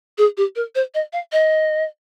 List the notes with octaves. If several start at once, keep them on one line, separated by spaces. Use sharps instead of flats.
G#4
G4
A#4
C5
D#5
F5
D#5